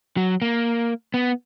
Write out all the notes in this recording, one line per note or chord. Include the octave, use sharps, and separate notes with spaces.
F#3
A#3
B3